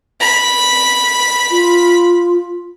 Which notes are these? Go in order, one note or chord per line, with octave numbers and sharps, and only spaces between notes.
B5
F4